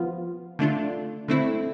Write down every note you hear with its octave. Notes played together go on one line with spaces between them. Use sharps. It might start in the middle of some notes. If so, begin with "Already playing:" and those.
Already playing: F3 B3 F4
D3 A3 D4 F4
D3 A3 C4 E4